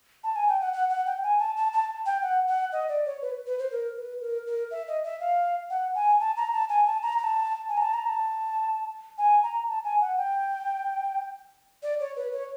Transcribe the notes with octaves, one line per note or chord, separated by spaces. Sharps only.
A5
G#5
G5
F#5
F#5
F#5
G5
G#5
A5
A5
A5
G5
F#5
F#5
D#5
D5
C#5
B4
B4
C5
A#4
B4
A#4
A#4
E5
D#5
E5
F5
F#5
G#5
A5
A#5
A5
G#5
A5
A#5
A#5
A5
G#5
A#5
A5
A#5
A5
G#5
A#5
A5
G#5
F#5
G5
D5
C#5
B4
C#5